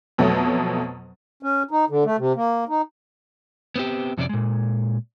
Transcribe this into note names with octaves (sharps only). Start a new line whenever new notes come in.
F2 B2 F#3 A3
C#4
D#4
D3
A3
C3
A#3
D#4
B3 C4 G4
F2 C3 C#4 D4 D5
A#2 G#3